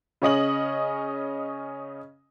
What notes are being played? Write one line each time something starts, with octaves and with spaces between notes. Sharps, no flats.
C#3 C#4 D#5 F#7